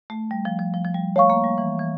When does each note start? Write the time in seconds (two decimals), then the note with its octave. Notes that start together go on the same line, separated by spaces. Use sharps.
0.10 A3
0.31 G3
0.45 F3
0.59 F3
0.74 F3
0.85 F3
0.94 G3
1.16 A3 C#5 F5 C#6
1.30 A#3
1.44 G3
1.58 E3
1.79 E3